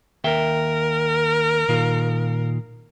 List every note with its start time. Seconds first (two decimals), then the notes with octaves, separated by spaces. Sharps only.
0.24 D#2 A#4 E5 G5
1.69 A#2 D#3 F4